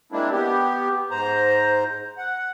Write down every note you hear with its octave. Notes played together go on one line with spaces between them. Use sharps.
G#3 A#3 C4 D4 E4
B3 G4
G#2 C5 A#5
F#5